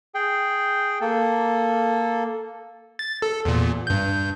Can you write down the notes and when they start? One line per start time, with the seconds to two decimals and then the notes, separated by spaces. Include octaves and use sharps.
0.14 G#4 G5
1.01 A#3 A4
2.99 A6
3.22 A4
3.45 E2 A#2
3.87 G2 G6